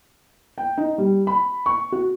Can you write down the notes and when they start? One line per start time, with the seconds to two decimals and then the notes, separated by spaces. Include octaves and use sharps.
0.58 G5
0.78 D#4
0.98 G3
1.27 B5
1.66 C#6
1.92 F#4